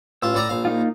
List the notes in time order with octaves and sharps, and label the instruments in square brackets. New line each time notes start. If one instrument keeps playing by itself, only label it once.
[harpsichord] A1 F4 [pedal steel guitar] E6
[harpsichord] A2 D5 A#5
A#1 F5
[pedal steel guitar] A#3 D#4 F4